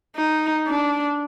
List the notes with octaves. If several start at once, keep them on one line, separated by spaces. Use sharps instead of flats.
D#4
D4